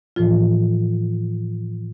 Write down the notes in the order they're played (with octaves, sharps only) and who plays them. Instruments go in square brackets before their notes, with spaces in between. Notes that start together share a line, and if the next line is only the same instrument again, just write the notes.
[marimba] A2 E3 F3 F4